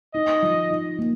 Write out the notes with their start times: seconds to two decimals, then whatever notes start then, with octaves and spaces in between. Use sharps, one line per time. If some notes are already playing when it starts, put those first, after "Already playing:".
0.14 D#4 D#5
0.42 F3
0.70 D#4
0.99 A#3